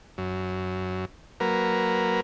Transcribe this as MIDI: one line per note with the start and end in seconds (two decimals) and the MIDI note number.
0.18 1.05 42
1.40 2.21 54
1.40 2.21 58
1.40 2.21 70
1.40 2.21 71